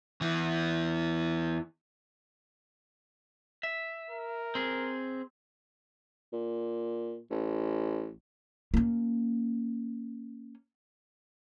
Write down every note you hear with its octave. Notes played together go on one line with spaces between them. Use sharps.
E2 E3
E5
A#4
C4 G#4
A#2
A1
A#3 C#4